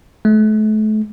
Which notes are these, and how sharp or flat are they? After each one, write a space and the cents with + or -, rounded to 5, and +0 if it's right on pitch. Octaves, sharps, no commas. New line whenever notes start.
A3 -35